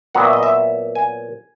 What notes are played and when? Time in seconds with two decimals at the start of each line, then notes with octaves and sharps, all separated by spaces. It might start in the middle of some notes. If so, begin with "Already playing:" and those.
0.15 A#2 F#3 B3 F#5
0.24 E5
0.33 D#5
0.43 E5
0.95 G#5